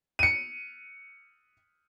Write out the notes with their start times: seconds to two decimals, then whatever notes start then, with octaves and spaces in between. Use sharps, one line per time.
0.19 C#7 D#7